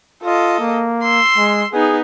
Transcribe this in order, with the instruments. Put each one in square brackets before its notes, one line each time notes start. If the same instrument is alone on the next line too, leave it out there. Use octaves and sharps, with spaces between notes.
[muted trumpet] F4 [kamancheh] A4 D#5
[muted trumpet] A#3
[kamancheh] C6 E6
[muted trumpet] G#3
[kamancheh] B3 D#4 [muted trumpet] G#4